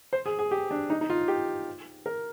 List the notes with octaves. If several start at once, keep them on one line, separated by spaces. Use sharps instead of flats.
C5
G#4
G#4
G4
D4
D#4
D#4
F4
G4
A#4